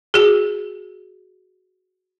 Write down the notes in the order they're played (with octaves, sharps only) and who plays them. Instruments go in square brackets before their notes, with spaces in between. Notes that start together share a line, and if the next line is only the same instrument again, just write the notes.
[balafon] F#4 G#4